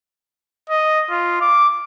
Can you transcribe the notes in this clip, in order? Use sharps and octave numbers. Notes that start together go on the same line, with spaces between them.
D#5
F4
D6